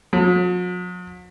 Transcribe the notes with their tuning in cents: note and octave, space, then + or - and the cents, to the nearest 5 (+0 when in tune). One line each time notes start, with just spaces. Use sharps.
F#3 -45